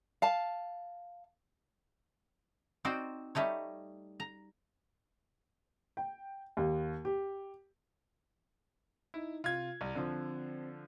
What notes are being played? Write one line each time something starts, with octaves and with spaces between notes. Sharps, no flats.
F5 A5
C4 D#4 F#4 C5 D5
G3 A3 D#4 C#5
A#5
G5
D#2
G4
D#4 E4
C3 F4 G#6
C2 G3
D3 F3 C4